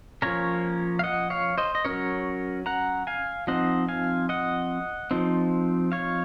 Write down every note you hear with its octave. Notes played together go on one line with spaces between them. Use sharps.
F3 A#3 C#4 A#4 C#5
F5
D#5 F#5
C#5 F5
C5 D#5
D#5
F#3 C#4 A#4 C#5
F#5 A#5
F5 G#5
F3 C4 D#4 D#5 F#5
F5 G#5
D#5 F#5
F3 C4 D#4
C#5 F5